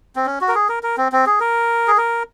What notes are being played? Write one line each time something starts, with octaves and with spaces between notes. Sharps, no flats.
C4
C#4
F#4
A#4
G#4
A#4
A#4
C4
C4
G#4
A#4
G#4
A#4